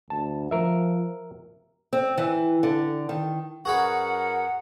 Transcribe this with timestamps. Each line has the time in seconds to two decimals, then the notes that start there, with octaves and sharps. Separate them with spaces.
0.10 D2 A5
0.51 F3 A#4 E5
1.93 C4
2.18 E3
2.63 D3
3.09 D#3
3.65 F#2 F#4 G#4 A#4 B4 F#5